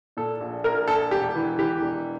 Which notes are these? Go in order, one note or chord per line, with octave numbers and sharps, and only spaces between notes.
A#2 A4
A#1
A#1 A#4
A#1 A4
E1 G4
E3
E3 G4
E1